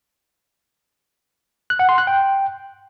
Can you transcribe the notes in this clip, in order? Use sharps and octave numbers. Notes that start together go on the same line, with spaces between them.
F#6
F#5
C6
F#6
G5